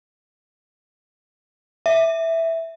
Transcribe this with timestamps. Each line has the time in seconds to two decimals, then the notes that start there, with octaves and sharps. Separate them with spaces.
1.86 E5